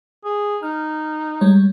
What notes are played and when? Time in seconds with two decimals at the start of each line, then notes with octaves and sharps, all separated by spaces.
0.24 G#4
0.63 D#4 F6
1.41 G3 G#3 C#5